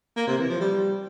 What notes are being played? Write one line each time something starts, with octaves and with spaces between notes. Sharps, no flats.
A#3
C3
E3
F3
G3